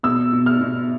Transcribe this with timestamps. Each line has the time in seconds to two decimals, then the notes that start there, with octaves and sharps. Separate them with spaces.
0.03 B2 E6
0.33 B2
0.46 F6
0.61 B2